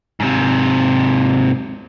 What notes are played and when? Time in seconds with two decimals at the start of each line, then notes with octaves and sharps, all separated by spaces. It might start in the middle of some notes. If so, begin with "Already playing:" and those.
0.20 G#2 C3